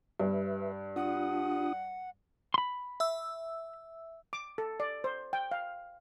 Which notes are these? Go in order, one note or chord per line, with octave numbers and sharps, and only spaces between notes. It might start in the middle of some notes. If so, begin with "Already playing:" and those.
G2 B4 E5
D4 F4 F#5 D#6
B5 C6
E5 E6
D6
A4
D5
C5
G5
F5